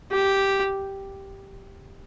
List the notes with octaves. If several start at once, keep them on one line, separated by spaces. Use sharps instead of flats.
G4